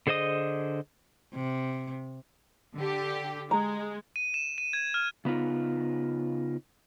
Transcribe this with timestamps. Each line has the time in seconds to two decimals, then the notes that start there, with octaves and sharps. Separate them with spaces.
0.07 D3 G#4 C5 D#5 D#6
1.34 C3
2.75 D3 G4
3.51 G#3 A#5
4.16 D#7
4.34 E7
4.58 D#7
4.73 G#6
4.94 F6
5.25 C#3 B3 D#4 F4